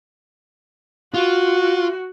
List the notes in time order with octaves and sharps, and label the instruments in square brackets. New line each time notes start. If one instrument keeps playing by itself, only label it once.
[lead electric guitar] F4 [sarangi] F#4